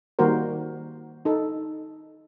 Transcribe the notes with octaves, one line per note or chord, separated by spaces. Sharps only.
D#3 G3 A#3 F#4 A#4 C5
D#4 A4